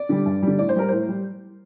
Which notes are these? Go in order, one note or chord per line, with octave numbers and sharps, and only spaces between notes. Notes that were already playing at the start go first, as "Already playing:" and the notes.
Already playing: D5
D3 G3
G2
D3 G3
A2 D5
C5
G3 A#4
A2 C5
G3